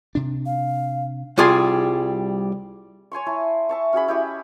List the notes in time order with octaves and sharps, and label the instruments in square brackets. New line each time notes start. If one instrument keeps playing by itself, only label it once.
[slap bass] C3 D4
[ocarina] F5
[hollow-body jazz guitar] C2 G3 F4 G#4 A5 C6
[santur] C#5 G#5 C6 C#6
E4 A5 C6
E5 A5 C#6
C#4 F#4 G#4 B5
E4 G4 D#5 C#6